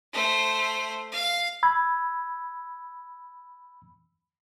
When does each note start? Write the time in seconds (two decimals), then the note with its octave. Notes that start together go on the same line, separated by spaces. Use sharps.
0.13 A3 C5
1.12 F5
1.63 B5 E6 G#6